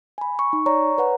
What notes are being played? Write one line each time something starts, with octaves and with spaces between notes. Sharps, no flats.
G#5 B5
C#6
D#4
C#5 D5 A#5 C#6
B4 C#5 F#5 A#5